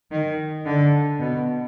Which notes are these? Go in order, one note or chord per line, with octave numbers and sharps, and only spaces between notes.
D#3
D3
B2